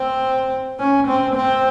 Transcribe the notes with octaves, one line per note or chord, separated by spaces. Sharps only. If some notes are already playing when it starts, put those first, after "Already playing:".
Already playing: C4
C#4
C4
C4